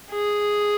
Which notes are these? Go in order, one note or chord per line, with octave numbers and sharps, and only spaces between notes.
G#4